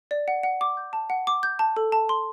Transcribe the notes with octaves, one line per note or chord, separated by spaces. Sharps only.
D5
F#5
F#5
D6
G6
A5
F#5
D6
G6
A5
A4
A5
C6